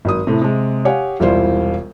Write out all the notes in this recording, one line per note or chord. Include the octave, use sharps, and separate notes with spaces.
G#1 F#3 D#6
A2 C3
C3 G#3
G4 C#5 F5 F#5 G#5
E1 C2 G3 E4 F4 C5